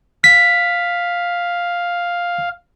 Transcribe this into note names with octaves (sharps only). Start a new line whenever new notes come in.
F5 B6